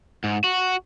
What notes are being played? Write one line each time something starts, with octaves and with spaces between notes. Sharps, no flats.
G#2
F#4